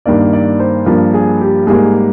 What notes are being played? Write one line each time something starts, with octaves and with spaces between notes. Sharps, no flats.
G2 D#3 A#3 D5
D5
C5
G2 F3 A#3 A#4
G#4
G4
G#2 G3 A#3 G#4